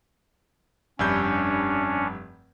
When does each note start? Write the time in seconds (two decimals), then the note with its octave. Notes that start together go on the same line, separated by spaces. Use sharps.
0.99 F1 G2 C#4 D4 G6